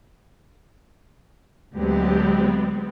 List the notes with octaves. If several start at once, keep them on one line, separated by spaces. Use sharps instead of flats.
D2 F#3 G#3 B3 C4 G4